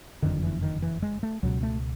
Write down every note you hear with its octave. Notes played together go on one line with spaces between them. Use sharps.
F#1 F2 D3 D#3
E3
D#3
E3
G#3
A3
C#2 B2 F#3
A3